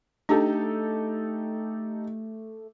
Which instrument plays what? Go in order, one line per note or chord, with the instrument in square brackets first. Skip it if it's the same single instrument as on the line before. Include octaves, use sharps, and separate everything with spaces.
[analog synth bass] A3 [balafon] D4 [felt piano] D#4 G4 A4